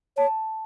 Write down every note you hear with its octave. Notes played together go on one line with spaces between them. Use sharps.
C#5 A5